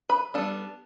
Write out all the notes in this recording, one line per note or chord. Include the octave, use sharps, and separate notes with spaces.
B4 B5
G3 B3 D4 A4 A5